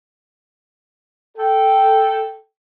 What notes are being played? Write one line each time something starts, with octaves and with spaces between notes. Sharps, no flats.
A4 G5